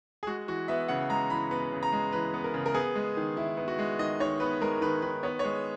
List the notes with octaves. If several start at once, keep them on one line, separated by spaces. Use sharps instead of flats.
G#4
G#3 F#4
E3 F#4
B3 E5
C#3 F#5
G#3 A#5
E3 B5
B3 B5
C#3
A#5
G#3
E3 B4
B3
A#4
C#3
A#4
B3 G#4
G#3
D#3
D#3 E4
B3
F#4
G#3
D#3 D#5
D#3 C#5
B3 B4
G#3 A#4
D#3 B4
D#3 B4
B3 C#5
C#5
G#3